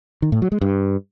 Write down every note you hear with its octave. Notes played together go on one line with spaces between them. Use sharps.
D#3
A2
F#3
G#3
G2